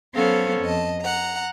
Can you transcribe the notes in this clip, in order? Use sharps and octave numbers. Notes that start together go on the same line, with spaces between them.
F#3 B3 C#4 A4 C5 F5
F2 D#5 A5
F#5 A#5